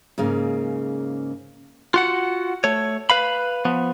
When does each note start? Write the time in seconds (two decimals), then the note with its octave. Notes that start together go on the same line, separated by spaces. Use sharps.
0.18 G#2 C#3 A#3
1.94 F4 F#4 F#5
2.64 A3 C#5
3.10 B4 F5 B5
3.65 F3 B3